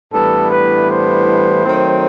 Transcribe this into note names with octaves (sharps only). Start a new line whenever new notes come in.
A2 E3 G3 B3 D4 A4
B4
C5
D#3 F#3 A3 C4